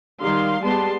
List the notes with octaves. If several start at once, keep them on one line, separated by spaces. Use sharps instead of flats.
D#3 G3 F5 C6
G3 G#3 B3 A5 C6